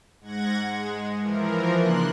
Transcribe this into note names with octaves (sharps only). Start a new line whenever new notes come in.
G#2 F#5 G#6 A#6
G#3
E3 F3 A#4
C#3 A#3 D4 C6 F#6